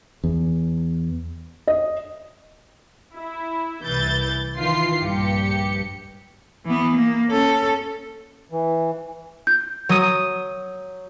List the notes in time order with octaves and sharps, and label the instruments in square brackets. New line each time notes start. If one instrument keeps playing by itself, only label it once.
[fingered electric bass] E2
[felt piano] D#5
[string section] E4
C2 E3 G6 A6
D#3 E3 F4 C7
A#1 G2 G4 C#7
[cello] E3 B3
A#3
C#4 A4
[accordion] E3
[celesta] G6
[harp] F#3 D#6 D#7